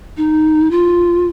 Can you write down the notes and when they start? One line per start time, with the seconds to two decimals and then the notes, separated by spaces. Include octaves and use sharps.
0.17 D#4
0.71 F4